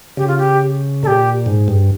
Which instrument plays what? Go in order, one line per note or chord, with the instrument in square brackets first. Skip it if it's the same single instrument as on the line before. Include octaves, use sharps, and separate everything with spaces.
[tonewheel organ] C#3 [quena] G4
[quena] F4
G4
[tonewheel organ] A#2 [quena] A4
[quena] G4
[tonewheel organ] G#2
G2